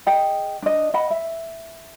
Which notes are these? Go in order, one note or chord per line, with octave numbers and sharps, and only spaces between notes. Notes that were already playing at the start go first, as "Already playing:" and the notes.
G#4 D#5 G5
D4 D#5
D#5 F#5 B5
E5